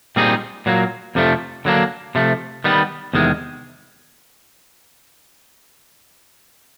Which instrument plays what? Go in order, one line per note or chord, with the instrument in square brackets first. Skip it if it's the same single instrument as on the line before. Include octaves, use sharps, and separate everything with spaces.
[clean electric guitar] A#2 G3 C4 D#4 G#4
A#2 F#3 A#3
F2 C3 F3 A3 D4
D3 F#3 A#3 D4
C3 F3 A3
D#3 G3 B3
E2 C3 D#3 G#3